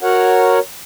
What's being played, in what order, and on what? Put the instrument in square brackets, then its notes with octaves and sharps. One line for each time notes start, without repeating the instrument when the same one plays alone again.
[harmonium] F#4 A#4 C#5 F#5